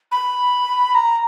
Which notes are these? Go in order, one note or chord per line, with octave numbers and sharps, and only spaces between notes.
B5
A#5